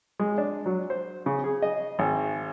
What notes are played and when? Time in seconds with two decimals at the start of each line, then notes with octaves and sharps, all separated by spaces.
0.19 G#3
0.38 D4
0.66 F#3
0.90 C5
1.26 C#3
1.44 G#4
1.62 D#5
1.99 G#1